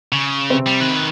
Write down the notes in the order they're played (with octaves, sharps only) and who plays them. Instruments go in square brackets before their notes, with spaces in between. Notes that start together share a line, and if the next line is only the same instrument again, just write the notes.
[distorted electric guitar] C#3
[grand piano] C3 C4
[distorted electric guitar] G3
D#3 B4